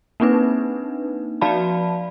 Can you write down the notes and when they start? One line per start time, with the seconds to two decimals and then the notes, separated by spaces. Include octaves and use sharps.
0.20 A#3 C4 D4 D#4 B4
1.41 F3 F#4 D5 F5 A5 B5